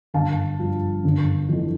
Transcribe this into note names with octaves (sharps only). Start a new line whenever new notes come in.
G1 F5 A5
G2 F3
G1
F2 E3